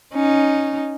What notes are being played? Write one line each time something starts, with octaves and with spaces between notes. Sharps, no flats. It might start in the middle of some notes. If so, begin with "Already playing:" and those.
C#4 D#4